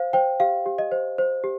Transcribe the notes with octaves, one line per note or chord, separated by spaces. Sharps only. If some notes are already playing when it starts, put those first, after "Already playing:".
Already playing: C5 F5
C5 G5
G4 F5
G4
D#5
C5
C5
G4